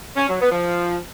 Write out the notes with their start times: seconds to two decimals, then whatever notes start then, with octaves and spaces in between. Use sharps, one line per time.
0.16 C#4
0.28 F#3
0.40 B3
0.52 F3